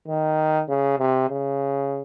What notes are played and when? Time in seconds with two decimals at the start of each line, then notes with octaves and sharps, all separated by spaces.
0.08 D#3
0.68 C#3
0.99 C3
1.29 C#3